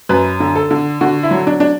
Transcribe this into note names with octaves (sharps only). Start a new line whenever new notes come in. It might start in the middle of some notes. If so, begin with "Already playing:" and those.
F#2 B4
D3
A4
D3
D3 F#4
E4
F#3
D4
D4